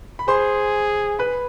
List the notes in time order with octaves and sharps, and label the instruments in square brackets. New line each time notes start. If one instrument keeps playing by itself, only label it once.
[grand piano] B5
[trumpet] G#4 [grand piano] C5 C6
[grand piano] B4 B5